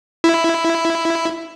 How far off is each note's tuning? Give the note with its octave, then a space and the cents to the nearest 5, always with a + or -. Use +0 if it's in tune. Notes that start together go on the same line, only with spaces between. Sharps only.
E4 +5